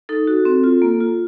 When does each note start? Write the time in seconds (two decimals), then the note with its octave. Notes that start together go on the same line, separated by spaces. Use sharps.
0.09 D#4 A4
0.27 F#4
0.45 C4
0.64 F4
0.82 A#3
1.01 F4